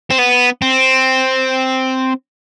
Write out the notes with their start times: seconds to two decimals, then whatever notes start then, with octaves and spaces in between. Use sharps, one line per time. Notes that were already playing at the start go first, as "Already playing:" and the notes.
0.11 C4
0.19 B3
0.62 C4